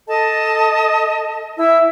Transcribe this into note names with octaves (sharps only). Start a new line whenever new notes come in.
A4 D#5 A5
E4 E5 E6